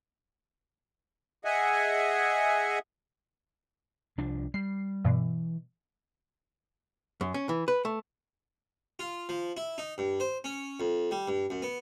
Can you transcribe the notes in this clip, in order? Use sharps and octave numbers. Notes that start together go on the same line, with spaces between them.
G#4 D#5 E5 F#5 G#5
C2 F3 D4
G3 C7
G2 B2 E3
F#2
C#4
E3
B4
A3
F4
F3
E4
D#4
G2
C5
C#4
F2
G3
G2
F#2
B3